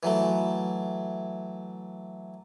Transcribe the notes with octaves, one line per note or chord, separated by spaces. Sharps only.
E3 F#3 A3